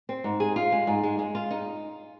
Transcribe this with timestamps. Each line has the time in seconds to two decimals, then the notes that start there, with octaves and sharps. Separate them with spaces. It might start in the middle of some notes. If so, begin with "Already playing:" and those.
0.09 C4
0.24 G#2
0.40 G#4
0.56 F4
0.72 G#3
0.87 G#2
1.03 G#3
1.19 G#3
1.35 F4
1.51 D#4